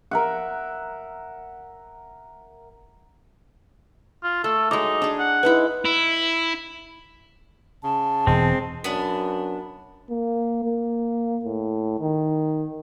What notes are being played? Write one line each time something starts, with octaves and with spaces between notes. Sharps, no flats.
A#4 E5 F#5
F4
A3 A4
F#3 G#3 D#4 D6
D4 G#4
F#5
G#3 D#4 E4 B4
E4
C#3 A5
E1 G#3 C4
F#2 B3 D4
A#3
A#3
A2
D#3